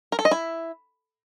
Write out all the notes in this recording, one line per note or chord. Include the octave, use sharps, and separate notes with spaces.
A#4
A4
D#5
E4